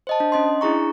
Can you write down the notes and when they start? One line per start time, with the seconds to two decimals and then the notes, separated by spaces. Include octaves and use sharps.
0.07 C5 D#5 A5
0.20 D4
0.32 C#4 D#5 C6
0.61 D4 E4 G#4 A#5 C#6